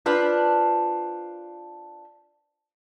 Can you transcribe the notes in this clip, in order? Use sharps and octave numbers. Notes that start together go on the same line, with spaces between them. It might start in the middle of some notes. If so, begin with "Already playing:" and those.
D4 F4 B4 C5